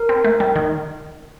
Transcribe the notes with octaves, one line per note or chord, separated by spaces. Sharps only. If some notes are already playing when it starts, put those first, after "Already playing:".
Already playing: A#4
C4
A3
G3
D#3